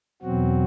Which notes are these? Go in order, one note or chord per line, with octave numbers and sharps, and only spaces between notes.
E2 B2 F#3 C4 F#4